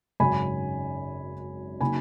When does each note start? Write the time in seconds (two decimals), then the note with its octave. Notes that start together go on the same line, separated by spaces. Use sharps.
0.20 G#1 F#2 C#3 G#5 B5
1.81 C#3 F#3 A#3 D#4 G#5 B5